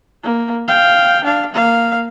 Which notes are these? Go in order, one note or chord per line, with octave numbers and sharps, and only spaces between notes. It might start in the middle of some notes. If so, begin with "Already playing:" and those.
A#3
F5 G5
D4 F5
A#3 F5